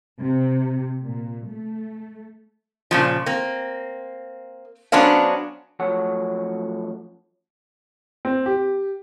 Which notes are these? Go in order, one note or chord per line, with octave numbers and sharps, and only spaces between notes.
C3
A#2
A3
A#2 C#3 F3
A#3 C4
F#3 B3 C#4 D4 C5 F5
F#2 F3 A3 C#5 F#5
C4
G4